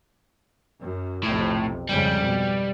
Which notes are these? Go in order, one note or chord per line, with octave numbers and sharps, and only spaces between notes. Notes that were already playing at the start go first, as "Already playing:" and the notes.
F#2
B1 F2 A2 C3
F2 G#2 C#3 G3
B2